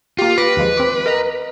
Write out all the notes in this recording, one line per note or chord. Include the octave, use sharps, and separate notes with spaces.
A#3 F4 G4
B4 D6 A#6
D#2 F3 G#3
C4 D6
A#4 D#5 A#5